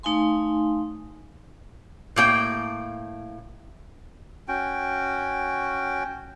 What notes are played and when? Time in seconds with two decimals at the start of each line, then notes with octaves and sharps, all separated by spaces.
0.03 A3 D#4 F5 G#5 C6
2.16 A2 A#3 G5
4.48 C#4 F#4 G5